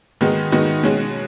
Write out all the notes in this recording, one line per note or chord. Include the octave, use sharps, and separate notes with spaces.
D#3 G#3 B3 D#4 F#4
D#3 G#3 B3 D#4 F#4
B2 G#3 C#4 F#4